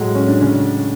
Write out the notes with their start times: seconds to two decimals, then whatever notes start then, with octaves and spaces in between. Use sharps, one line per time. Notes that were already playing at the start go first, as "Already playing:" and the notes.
Already playing: A2 F#3 G#3 A3
0.15 C#4
0.28 D4
0.41 C#3 C#4